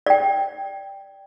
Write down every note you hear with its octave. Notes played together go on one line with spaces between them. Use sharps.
D5 G5